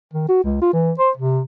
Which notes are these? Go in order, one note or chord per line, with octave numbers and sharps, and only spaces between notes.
D#3
F#4
C#2
F4
E3
C5
C3